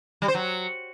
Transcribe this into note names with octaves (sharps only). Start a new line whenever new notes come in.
G3
C5
F#3